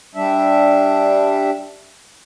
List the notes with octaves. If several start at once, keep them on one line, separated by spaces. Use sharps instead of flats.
G3 D4 E5